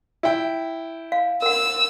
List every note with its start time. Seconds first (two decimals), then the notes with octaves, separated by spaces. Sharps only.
0.23 E4 G5
1.12 F5
1.42 A#4 F#5 E6